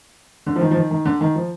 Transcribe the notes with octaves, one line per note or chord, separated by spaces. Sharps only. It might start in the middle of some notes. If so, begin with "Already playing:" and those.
D3
F3
D#3
F3
D#3
D#3
D3
D#3
F3